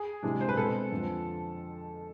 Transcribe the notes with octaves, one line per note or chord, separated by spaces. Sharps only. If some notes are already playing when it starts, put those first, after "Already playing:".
Already playing: G#4
C3 E3 G#3 D4
C5
B4
B2 G#3 C4 A4
F2 D3 F3